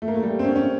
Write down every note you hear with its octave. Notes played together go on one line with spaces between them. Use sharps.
A3
A#3
A3
G3
C4
C#4
C#4